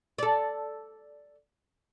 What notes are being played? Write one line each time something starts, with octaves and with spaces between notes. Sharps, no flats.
A4 D5